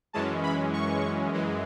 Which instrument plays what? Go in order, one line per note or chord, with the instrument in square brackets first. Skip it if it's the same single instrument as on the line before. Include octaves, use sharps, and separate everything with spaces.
[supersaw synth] F#2 E3 G#3 C#4 A5
B5
C#6
F#2 E3 G#3